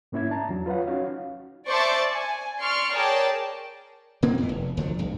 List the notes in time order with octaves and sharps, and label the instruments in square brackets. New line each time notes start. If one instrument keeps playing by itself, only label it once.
[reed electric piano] G#2 A#3 C#4 E4 E5 G#6
D4 A5 A#5
E2 F#3
F4 B4 C#5 F5 F#5
C#4 D#4 F#4 C#5 F5
[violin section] C5 D5 E5 A5 C#6
G#5
D5 C6 C#6 F6
G#4 A#4 C#5 D5 G5 A5
[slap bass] B2 A#3 C4
F2 A#2 E3
F1
D2 F3 F#3
B1 G2